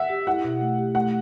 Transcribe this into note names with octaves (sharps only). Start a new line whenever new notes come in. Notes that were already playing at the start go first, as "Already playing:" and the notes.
Already playing: E5 F#5
G4
E4 F#5
B2
A3
G4
A3 F#5